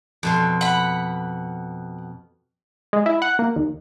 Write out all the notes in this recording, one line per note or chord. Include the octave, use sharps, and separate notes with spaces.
F2 B2 C6
F#5 B5
G#3
E4
F#5
A#3
D#2